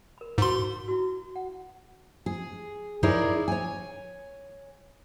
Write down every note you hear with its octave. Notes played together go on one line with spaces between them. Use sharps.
A#4 B5
G#2 E4 F#4 C6
E4 F#4
F#5
G#4
D#4 E4 G#4 A#4 C#5 D5
C#5 G#5